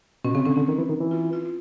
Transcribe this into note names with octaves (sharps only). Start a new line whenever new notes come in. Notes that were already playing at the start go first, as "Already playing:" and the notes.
B2 C#4
C#3 C4
D3 C#4
D3 C#4
D#3
E3
D#3
E3
F4
F4